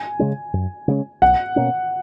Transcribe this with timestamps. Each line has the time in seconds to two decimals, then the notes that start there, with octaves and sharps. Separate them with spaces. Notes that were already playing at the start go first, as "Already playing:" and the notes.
Already playing: G#5
0.19 C#3 G#3 C#4
0.53 F#2
0.88 C#3 G#3 C#4
1.22 B1 F#5
1.56 B2 A#3 C#4